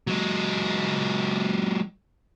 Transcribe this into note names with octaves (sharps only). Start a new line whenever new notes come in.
F#3 G#3